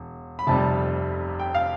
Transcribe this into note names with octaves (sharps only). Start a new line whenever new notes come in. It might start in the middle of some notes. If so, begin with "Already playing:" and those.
Already playing: E1
B5
F1 F2 C3 G3 A5
G5
F5